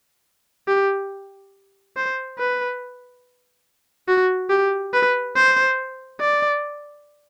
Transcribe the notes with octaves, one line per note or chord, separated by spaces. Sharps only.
G4
C5
B4
F#4
G4
B4
C5
D5